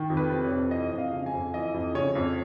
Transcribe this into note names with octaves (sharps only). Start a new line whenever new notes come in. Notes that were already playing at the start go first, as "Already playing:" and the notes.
Already playing: D#3
F2
B4
C3
C#5
F2
E3 D#5
F2
F5
C#3
G#5
F2
E3 D#5
F2
C#3 C#5
F2